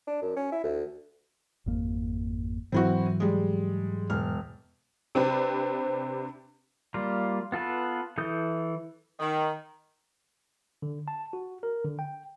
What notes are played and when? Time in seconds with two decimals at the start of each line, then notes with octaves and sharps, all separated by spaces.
0.07 D4
0.22 F#2
0.36 C#4
0.52 E4
0.64 D2
1.66 G#1 F2 A#3
2.72 G#2 E3 F#3 C4 E4 F#4
3.20 G3 G#3
4.10 E1 F6
5.15 C3 C4 D4 G4 B4
6.94 G3 A#3 F4
7.52 B3 F4 A4 B4
8.18 E3 A4 D#6 G6
9.20 D#3
10.82 D3
11.08 A5
11.33 F#4
11.63 A#4
11.84 D3
11.99 G5